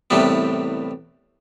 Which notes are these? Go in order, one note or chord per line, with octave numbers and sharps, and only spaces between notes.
C2 A2 C3 E3 G3 B3